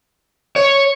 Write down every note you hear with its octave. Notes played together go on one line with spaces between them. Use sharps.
C#5